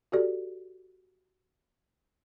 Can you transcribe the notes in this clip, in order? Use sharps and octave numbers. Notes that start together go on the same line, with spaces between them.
F#4 G4 A4 D5